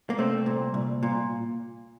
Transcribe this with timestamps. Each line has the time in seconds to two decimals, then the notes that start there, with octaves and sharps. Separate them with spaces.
0.10 A#3
0.18 C2 A3 C4
0.46 A#2
0.74 C2
1.03 A#2